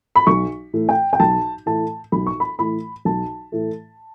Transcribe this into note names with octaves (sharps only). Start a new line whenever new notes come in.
B5
B1 C#6
A2 E3 A3
G5
G5
B1 A5
A2 E3 A3 A5
B1 B5
C#6
B5
A2 E3 A3 B5
B1 A5
A2 E3 A3